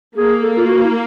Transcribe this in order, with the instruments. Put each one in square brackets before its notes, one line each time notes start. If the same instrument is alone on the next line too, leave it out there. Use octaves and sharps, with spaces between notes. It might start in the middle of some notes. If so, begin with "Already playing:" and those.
[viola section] A#3 [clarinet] G#4
[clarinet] A4
F4
F#4
E4